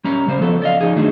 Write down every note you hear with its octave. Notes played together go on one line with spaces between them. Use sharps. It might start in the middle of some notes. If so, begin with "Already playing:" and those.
G3 C#4 A#5
C#3 G3 C5
F3 B3 A4
D5 D#5 F5
F3 D#4 G#4
D#3 F#3 A3 D4 G#4